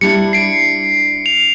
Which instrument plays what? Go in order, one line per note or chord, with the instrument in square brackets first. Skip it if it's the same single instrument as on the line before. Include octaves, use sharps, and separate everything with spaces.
[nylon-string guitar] G3 D4 E4 [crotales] C#7
[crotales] C7 D7
F7